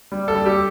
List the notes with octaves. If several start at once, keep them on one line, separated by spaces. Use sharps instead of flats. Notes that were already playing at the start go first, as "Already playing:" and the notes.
G3
A4
G3
G4